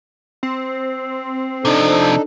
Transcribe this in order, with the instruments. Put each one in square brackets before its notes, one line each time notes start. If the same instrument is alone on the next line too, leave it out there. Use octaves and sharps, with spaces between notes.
[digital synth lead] C4
[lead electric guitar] C3 F3 [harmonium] D4 D#4 A4